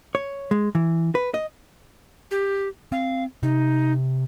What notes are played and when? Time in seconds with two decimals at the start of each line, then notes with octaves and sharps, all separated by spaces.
0.15 C#5
0.51 G#3
0.75 E3
1.15 B4
1.34 D#5
2.31 G4
2.92 C4 F5
3.43 C3 D#4